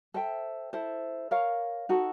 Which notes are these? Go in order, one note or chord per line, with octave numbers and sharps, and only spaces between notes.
A4 C5 E5 G5
E4 A4 C5
A#4 C#5 F5
D#4 F#4 A4